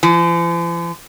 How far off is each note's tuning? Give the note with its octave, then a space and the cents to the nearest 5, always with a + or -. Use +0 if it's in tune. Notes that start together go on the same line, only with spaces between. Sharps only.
F3 -45